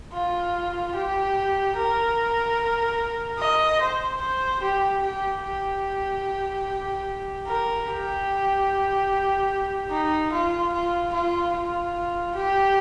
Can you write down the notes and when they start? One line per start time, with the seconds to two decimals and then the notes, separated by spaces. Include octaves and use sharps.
0.13 F4
0.95 G4
1.77 A#4
3.39 D#5
3.81 C5
4.21 C5
4.62 G4
5.02 G4
5.43 G4
7.47 A#4
7.87 G4
9.91 D#4
10.32 F4
10.73 F4
11.14 F4
11.54 F4
12.35 G4